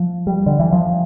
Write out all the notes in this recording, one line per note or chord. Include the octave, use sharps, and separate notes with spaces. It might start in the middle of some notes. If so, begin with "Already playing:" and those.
Already playing: F3
G3
D3
E3
F3